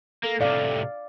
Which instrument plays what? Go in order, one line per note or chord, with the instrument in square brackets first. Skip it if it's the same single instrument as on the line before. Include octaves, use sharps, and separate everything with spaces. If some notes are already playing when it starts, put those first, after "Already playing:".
[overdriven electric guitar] A#3 [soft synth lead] A4
[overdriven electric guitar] A2 C3 [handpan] D5 F5